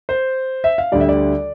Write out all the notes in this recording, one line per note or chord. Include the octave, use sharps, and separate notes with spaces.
C5
E5
F5
D2 D3 G3 D5
E5
D5